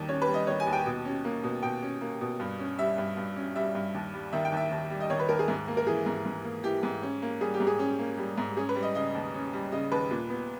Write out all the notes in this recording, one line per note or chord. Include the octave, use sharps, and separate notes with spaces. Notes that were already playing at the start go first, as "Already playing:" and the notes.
Already playing: D#2 D#3 G3
C#4 C#5
B4
G3
D#5
D#3 C#5
G#5
D#2
G5
B2
C#4
A#3
B2
B2 G5
C#4
A#3
B2
G2
C#4
G3 E5
G2
G2
C#4
G3 E5
G2
D#2
G3
D#3 E5
G5
D#2 E5
D#2
G3
D#5
D#3 C#5
B4
D#2 A#4
G#4
G#2
A#3
A#4
E3 G#4
G#2
G#2
A#3
E3 G4
G#2
C#4
A#3
G3 G#4
G4
G#2
G#4
C#4
A#3
G3
G#2
C#4 G#4
B4
G3
D#5
C#3 D#5
D#2
C#4
G3
C#3 D#5
D#2 B4
A#2
B3